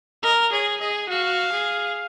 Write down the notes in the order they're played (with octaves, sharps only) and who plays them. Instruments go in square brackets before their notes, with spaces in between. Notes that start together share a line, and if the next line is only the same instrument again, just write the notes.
[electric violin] A#4 [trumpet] D#5
[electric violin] G#4 [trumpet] C#5
[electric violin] G#4 [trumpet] D#5
[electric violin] F#4 [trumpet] F5
[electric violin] G#4